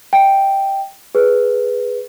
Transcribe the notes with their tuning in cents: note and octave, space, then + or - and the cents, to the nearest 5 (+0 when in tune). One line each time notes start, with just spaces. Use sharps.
D#5 +25 G5 +0
G#4 +0 B4 +0